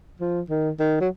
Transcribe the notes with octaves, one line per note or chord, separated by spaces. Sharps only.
F3
D#3
D#3
F#3